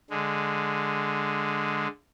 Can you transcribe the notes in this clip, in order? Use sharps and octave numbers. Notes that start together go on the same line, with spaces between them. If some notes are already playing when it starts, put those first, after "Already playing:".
D3 G#3